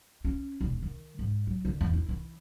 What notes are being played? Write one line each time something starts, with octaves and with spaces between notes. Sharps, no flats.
C#4
E1
D#3
G#2
F#3
D3
E2
E4
E3